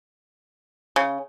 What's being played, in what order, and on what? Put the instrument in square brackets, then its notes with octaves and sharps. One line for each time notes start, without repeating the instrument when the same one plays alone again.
[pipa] C#3